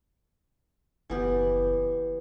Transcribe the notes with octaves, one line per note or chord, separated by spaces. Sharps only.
F#1 E3 B3 G4